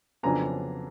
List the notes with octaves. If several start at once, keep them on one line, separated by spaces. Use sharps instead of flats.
F2 C#3 F#3 B3 D4 G#5 A#5